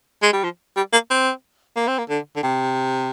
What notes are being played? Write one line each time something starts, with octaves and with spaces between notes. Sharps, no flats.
G#3
G3
F3
G3
A#3
C4
A#3
C4
A#3
D3
D3
C3